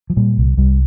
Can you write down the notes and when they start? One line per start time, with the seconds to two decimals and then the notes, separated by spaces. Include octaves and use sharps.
0.10 F3
0.17 A#2 G3
0.38 C2
0.58 C2 G3